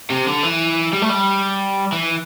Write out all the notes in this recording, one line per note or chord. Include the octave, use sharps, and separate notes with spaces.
C3
D3
E3
G3
A3
G3
E3